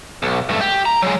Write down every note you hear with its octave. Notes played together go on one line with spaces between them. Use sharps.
B1
G2 A3
G4
A#5
F#3 G#3